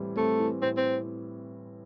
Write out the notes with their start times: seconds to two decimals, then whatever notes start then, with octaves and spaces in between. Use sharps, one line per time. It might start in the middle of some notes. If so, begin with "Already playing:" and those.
Already playing: A2 E3 G3 C4
0.16 A3 C4
0.40 E3
0.62 A2 C4
0.77 C4